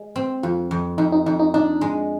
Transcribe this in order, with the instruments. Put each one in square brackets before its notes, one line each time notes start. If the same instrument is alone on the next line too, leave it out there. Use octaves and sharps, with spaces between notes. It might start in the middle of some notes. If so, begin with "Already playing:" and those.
Already playing: [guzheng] G#3
C4
[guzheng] F2 [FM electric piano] F4
[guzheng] F2
[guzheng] F2 [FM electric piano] D#4
[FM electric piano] D#4
[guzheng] F2 [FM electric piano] D#4
[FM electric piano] D#4
[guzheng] D4 [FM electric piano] D#4
[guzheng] G#3